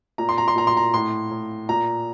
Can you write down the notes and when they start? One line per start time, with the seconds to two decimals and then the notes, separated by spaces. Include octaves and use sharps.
0.18 A#2 A#5
0.29 C6
0.38 A#5
0.48 C6
0.56 A#2 A#5
0.67 C6
0.77 A#5
0.94 A2 C6
1.31 A2
1.69 A#2 A#5